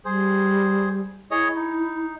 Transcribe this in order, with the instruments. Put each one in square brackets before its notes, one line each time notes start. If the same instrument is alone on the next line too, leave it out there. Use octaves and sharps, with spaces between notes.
[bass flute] G3 [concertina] G#4 C5
[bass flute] E4 [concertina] G#4 C#5 D#5
[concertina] D#4